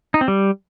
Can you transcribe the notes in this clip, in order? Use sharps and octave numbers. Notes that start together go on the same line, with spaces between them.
D#4
C4
G3